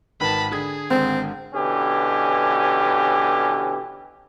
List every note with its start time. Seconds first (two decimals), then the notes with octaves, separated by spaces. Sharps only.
0.21 G#1 D#3 B4 A5 B5
0.52 D3 G#4 D#6 G#6
0.90 G#1 G#2 D3 C4
1.54 B2 D3 E3 C#4 G4